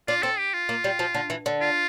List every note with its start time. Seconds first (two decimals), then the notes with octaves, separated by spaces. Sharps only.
0.08 D4 F4
0.23 C4 A4
0.38 G4
0.54 F4
0.69 A#3
0.84 G3
0.99 F3
1.15 D3
1.30 E3
1.46 D3
1.61 F4